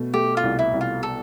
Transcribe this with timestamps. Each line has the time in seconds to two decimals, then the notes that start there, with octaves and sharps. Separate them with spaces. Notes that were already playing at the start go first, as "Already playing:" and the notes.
Already playing: B2 A3
0.14 A3 G4
0.37 F4
0.43 C2
0.59 E4
0.73 C2
0.81 F4
1.03 A4